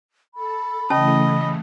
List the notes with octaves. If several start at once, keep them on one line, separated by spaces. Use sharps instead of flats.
A4 B5
C#3 E3 A3 C#4 D#5 A5